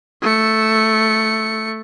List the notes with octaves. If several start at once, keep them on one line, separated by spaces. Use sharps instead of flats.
A3 C#7